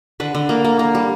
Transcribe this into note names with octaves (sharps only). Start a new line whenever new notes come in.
D3 B4
D3
A#3
A#3
A#3
G3